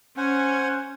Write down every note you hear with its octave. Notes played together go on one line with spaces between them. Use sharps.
C#4 C5 F#5 G#5